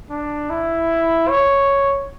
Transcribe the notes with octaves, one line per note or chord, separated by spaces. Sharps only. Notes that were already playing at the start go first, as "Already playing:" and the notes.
D4
E4
C#5